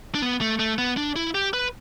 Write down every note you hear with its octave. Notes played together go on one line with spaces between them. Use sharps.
D4
B3
A3
A3
B3
D4
E4
G4
B4